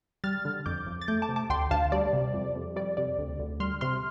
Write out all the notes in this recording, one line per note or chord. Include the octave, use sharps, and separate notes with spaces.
G3 F6 A6
D3
F2 D6 G6
F2
A6
A3 D6 G6
A5 D6
C3
A5 D6
D2 G5 C6
D2 F5 A5
G3 D5
C3
F2
F2
G3 D5
C3 D5
D2
D2
G3 C6 F6
C3 C6 F6